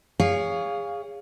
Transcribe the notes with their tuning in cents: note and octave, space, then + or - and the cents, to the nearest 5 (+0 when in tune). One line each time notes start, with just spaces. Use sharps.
G#4 -25 C#5 +20 F5 +0